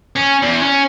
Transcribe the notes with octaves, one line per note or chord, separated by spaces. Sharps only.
C#4
E2
C#4